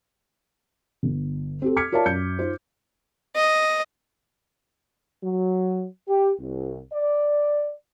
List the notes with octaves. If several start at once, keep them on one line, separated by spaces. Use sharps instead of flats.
G1
C4 G4 A4
D6 F6 G#6 B6 C#7
F4 A#4 C#5 D5 F5 A5
F#2 G6 C#7
D#4 F4 C5
D#5
F#3
G4
C2
D5